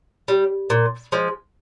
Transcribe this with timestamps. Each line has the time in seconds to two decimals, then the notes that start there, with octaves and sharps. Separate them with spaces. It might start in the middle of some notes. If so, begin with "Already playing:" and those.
0.28 G3
0.70 A#2
1.12 F3 G#3